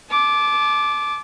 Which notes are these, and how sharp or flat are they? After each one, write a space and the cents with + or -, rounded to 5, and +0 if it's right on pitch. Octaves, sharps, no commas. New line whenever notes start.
A5 -35 D6 +0